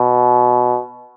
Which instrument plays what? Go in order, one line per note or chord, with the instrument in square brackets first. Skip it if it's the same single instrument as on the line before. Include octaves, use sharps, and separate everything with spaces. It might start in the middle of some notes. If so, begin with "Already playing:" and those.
Already playing: [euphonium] B2